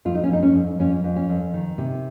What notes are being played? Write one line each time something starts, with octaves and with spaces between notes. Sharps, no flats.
F2 F4
D#4
C#4
F2 D#4
C#4
F2
F2 C#4
F2
C#4
F2
D#3
C3